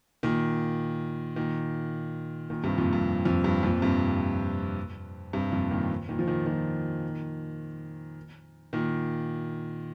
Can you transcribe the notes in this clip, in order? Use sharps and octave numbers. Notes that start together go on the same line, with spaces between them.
A#2 D#3
A#2 D#3
A#2 D#3
G2 C3
F2 A#2
G2
F2
G2
F2 A#2
G2 C3
G2 C3
F2 A#2
A#2 D#3
A#2 D#3
F3
A#2 D#3
A#2 D#3
A#2 D#3